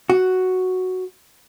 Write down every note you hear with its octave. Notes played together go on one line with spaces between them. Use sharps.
F#4